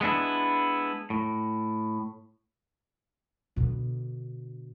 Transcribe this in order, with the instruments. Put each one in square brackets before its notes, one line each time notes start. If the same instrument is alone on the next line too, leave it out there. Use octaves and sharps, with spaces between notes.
[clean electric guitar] G#3 B3 D4 E4
A2
[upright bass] B2 D3